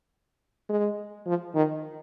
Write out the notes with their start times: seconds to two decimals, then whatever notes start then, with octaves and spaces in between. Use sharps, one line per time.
0.70 G#3
1.27 F3
1.55 D#3